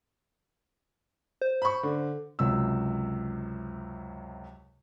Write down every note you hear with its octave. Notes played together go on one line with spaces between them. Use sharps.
C5
B5 C#6
D3
C#2 F#2 C3 E6